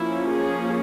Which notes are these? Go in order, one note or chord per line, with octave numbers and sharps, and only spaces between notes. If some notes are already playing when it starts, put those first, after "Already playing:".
Already playing: F3 A#3 C#4 E4
G#4